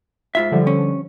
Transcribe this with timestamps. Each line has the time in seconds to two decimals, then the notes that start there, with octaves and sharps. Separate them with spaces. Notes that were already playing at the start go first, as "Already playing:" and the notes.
0.35 G#2 F4 E5
0.52 D3 F3 G3
0.67 C#4